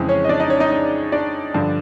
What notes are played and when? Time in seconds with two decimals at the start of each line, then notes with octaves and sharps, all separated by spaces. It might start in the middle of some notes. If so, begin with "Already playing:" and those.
Already playing: F2 C#3 E3 G#3 G#4
0.09 C#4 C#5
0.25 D#5
0.29 D4 D5
0.40 D#4 D#5
0.50 C#4 C#5
0.60 D#4 D#5
0.71 D#4 D#5
1.12 D4 D5
1.54 G2 D3 F3